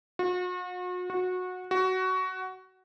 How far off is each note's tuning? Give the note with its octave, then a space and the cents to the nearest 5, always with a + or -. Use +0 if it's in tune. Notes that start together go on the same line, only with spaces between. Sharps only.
F#4 -40
F#4 -20
F#4 +15